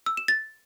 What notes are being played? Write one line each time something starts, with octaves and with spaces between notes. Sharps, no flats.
E6
E7
A6